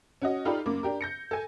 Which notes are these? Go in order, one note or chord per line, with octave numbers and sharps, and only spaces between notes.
C#4 F#4 D#5
D#4 F4 G4 A4 D5 B5
F#2 A#3 D6
D4 G4 A#4
G6 A#6 C#7
A4 G#5